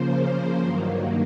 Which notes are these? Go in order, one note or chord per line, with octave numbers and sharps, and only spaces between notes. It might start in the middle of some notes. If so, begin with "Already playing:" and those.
Already playing: C#3 F3 A#3 C5
G2 D#3 F#3 A#3